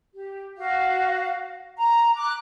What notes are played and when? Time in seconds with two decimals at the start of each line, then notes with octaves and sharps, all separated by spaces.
0.14 G4
0.56 F#4 F5
1.78 A#5
2.16 D6 F#6